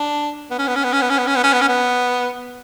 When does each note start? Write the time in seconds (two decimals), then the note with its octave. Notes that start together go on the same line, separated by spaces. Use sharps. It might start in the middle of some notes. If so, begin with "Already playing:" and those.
Already playing: D4
0.50 B3
0.59 C#4
0.67 B3
0.76 C#4
0.84 B3
0.93 C#4
1.01 B3
1.09 C#4
1.18 B3
1.27 C#4
1.35 B3
1.43 C#4
1.53 B3
1.61 C#4
1.69 B3